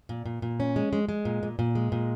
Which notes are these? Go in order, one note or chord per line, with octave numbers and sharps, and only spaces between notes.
A#2
A#2
A#2
C#4
G#3
G#3
G#3
A#2
A#2
A#2
G#3
A#2